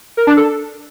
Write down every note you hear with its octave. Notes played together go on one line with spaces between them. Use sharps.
A#4
D4
A4